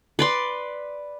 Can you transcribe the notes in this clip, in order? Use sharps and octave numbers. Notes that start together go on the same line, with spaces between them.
B4 D5 C6